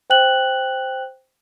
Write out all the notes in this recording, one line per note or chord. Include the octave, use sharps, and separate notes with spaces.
C5 G5 F#6 F#7